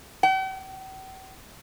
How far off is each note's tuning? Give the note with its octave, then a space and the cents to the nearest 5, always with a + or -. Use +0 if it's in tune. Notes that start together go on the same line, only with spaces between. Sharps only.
G5 -45